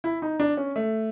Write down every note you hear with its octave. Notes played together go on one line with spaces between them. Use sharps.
E4
D#4
D4
C#4
A3